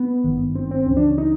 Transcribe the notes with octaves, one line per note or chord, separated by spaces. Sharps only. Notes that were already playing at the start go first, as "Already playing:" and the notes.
Already playing: B3
G#1 G2 D#3
C4
C4
C#2 C#3 E3 C#4
D4
C#4
D#4